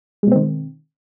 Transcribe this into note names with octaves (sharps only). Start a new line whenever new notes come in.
B2 D#3 G#3 C4